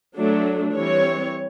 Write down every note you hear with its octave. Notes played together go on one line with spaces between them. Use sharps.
F#3 A3 D4
E3 G3 C4 C#5